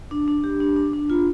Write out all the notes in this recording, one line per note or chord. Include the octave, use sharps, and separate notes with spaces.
D4
D4
G4
D4
D4
D4
F4